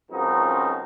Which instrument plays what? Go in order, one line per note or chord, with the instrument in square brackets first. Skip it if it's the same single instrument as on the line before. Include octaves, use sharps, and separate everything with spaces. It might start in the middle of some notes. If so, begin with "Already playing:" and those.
[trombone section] C#2 F#2 B2 F3 C4 D#4